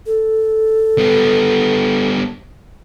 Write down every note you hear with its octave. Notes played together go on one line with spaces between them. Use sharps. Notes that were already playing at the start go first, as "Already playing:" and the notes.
A4
G3 B3